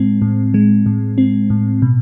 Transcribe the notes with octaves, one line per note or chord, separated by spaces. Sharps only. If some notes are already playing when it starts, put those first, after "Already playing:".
Already playing: A2 G#3 C4
A2
G#3
A2
C4
A2
B2